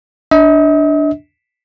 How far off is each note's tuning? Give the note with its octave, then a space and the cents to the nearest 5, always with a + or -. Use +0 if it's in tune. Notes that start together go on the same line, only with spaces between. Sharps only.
D4 +0 D#5 +45